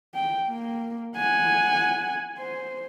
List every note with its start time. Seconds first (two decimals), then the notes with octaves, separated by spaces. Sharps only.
0.14 G5
0.48 A#3
1.17 F#5 G#5
2.38 C5